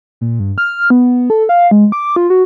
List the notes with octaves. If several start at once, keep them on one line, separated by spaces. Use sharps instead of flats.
A#2
G2
F6
B3
A4
F5
G#3
D6
F4
F#4